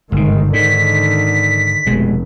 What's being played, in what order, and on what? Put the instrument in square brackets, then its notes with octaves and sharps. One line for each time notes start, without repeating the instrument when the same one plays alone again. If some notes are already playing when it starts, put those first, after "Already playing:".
[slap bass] G1 C3 [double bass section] G#2 D#3
[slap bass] G#2 [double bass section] D3 D#3 [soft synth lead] B6
[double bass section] F1 [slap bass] B2 G#3